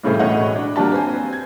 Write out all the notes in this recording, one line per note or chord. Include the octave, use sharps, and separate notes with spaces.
C2 A2 C#3 E3 A3 C5
E1 A2 C#5 D#5 F#5
D4
F#3 A#3 D4 G4 A5
C4 B4 C5 G#5
G#6